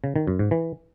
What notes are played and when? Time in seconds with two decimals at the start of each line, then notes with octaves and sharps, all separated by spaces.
0.04 C#3
0.16 D#3
0.27 F#2
0.39 G#2
0.51 E3